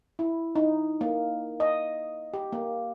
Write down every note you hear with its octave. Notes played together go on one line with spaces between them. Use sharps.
E4
D#4
A#3
D#5
G4
A#3